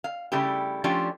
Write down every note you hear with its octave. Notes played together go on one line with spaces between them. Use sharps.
F5
C#3 G3 A3 E4 G4
F3 A3 C#4 D4 F4 G4